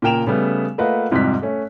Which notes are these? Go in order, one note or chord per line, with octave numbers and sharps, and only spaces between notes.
A#2 C#3 A#4 G5 E7 F7
C#3 G3 A3 B3
A3 A#3 F4 B4 D#5 F#5
F2 G#2 C3 G3 F#6 B6
A3 C#4